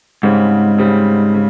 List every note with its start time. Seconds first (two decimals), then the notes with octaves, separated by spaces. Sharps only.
0.23 G#2 C#3 G3 C4
0.78 C#3 G3 C4
1.34 C#3